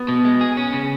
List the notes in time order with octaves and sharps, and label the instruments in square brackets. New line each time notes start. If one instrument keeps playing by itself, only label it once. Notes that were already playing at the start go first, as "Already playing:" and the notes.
Already playing: [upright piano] B3
[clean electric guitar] B2
G#3
G#4
C#4
C#3